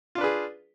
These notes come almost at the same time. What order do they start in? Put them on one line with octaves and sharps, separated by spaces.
F4 D4 B4 G#4